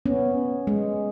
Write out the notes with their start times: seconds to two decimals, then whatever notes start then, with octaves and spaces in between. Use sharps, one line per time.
0.06 B3 C#4
0.67 G#3